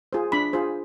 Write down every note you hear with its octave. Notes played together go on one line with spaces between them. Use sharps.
F4 G#4 C5
D4 B5
F4 G#4 C5